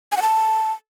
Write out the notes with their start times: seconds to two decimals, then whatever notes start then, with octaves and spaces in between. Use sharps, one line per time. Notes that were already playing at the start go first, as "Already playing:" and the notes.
0.12 G#5
0.17 F#5
0.22 A5